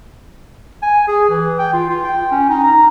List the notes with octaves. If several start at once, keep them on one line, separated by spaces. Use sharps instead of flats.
G#5
G#4
E3
G5
F4
F4
G5
C#4
D#4
A#5